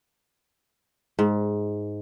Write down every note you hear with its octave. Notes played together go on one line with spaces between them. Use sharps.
G#2